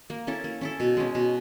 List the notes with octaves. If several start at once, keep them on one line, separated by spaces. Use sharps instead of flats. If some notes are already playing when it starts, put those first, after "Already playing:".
A#3
C#4 E4 A4
A#3
C#4 E4 A4
B2
G#3 C#4
B2